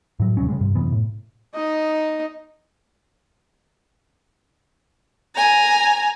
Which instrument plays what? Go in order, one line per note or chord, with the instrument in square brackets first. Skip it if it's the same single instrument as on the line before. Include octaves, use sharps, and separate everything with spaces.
[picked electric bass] A2 F#3
D#2 C3 F#3 C#4
C#3 G3 G#3
G2 C3
F#2 C3 E3 B3
A2
[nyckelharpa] D#4 D#5
[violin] G#5 A#5